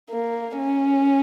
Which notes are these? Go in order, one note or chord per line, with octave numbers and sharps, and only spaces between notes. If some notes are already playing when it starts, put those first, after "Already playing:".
A#3
C#4